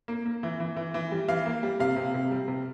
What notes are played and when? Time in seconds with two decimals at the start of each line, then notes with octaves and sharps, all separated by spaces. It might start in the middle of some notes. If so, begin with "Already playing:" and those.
0.08 A#3
0.26 A#3
0.43 E3
0.60 E3
0.77 E3
0.94 E3
1.12 G3
1.28 E3 F5
1.46 A#3
1.63 G3
1.80 C3 F5
1.96 C3
2.14 C3
2.31 G3
2.48 C3